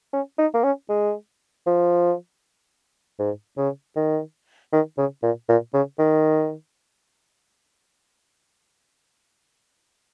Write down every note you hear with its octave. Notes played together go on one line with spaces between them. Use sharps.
C#4
D#4
A#3
C#4
G#3
F3
G#2
C#3
D#3
D#3
C#3
A#2
A#2
C#3
D#3